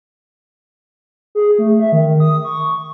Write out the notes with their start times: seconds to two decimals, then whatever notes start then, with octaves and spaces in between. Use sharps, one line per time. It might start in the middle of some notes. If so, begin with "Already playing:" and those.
1.35 G#4
1.58 A3
1.80 E5
1.92 D#3
2.20 D#6
2.44 C#6